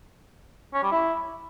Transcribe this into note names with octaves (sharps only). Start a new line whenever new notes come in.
C#4
G3
E4